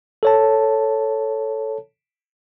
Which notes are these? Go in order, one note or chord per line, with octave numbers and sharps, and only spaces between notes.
A4 C#5 A5